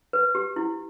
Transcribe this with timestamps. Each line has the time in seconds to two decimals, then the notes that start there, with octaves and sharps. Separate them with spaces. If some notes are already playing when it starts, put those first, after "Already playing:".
0.13 B4
0.35 G4
0.56 E4